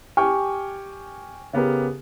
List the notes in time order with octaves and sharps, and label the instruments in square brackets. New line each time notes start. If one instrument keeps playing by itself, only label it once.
[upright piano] G4 G5 G#5 C#6 F6
C#3 B3 G4 A#4